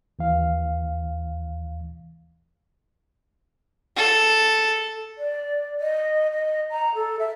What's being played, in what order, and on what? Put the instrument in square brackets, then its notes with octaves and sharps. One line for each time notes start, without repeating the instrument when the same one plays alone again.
[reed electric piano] D#2 E3 F5
[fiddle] A4
[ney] D5
D#5
D#5
A#5
A4
E5